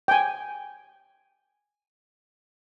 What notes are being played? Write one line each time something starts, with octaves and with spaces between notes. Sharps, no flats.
G5 G#5